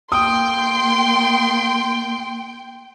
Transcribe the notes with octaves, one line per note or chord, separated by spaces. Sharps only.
A#3 G5 C6 D#6